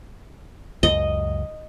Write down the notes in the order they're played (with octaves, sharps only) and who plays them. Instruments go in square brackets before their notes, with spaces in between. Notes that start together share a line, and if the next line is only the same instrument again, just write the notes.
[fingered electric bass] C#2 F#2 [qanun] D#5